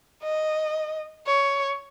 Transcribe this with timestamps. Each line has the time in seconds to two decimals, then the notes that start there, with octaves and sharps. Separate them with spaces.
0.23 D#5
1.27 C#5